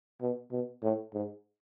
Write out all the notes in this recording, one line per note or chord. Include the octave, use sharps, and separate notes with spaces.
B2
B2
A2
G#2